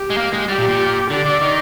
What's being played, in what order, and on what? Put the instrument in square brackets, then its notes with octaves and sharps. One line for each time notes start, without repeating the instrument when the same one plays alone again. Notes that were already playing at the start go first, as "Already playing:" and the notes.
Already playing: [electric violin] G4
[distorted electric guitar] G#3
A#3
G#3
[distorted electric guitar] G3 [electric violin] G4
[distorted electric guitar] A#2
A#2
[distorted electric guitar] D3 [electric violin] D5
[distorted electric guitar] D3
D#3